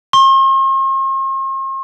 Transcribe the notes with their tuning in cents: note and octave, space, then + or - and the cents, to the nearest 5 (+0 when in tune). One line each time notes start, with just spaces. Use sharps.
C6 +45